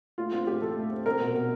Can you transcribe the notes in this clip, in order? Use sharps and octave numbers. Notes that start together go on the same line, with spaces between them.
A3 F4
C4 F4
A2 G4
E3 A4
A3
C4
C4 A#4
B2
B2